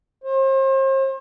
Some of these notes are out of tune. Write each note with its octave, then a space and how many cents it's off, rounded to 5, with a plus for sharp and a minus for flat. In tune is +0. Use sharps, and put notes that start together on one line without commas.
C5 +40